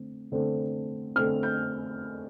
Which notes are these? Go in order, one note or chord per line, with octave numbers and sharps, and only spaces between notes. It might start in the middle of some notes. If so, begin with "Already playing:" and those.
Already playing: D3 A3 C4
D3 A3 C4
D3 A3 C4 F6
G6